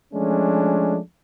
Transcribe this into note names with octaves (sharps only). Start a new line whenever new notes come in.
F3 G#3 A3 C#4 D4